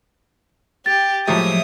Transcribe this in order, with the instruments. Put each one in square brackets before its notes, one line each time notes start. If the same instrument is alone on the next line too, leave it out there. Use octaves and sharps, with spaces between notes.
[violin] G4 [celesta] A6
[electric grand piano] A2 G#3 G4 [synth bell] F3 F#3 E5 [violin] D#6